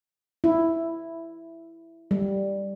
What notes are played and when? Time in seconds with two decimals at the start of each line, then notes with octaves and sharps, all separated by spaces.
0.44 E4
2.11 G3